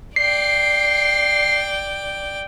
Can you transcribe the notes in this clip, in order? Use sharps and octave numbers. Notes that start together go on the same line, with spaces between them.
D5 G5 C7